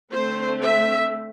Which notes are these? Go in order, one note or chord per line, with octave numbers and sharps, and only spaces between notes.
D3 A3 C4 C5
E5